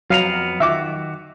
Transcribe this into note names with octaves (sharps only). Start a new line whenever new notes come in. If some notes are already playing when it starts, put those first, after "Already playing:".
F2 F#3 B3 F5 A#5
D#3 F#4 E5 D6